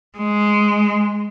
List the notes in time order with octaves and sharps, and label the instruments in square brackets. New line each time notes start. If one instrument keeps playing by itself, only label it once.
[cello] G#3